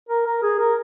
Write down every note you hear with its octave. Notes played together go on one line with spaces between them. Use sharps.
A#4
A#4
G#4
A#4